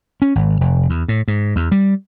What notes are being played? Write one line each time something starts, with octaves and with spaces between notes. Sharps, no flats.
C#4
G#1
F1
E2
A2
G#2
E2
G3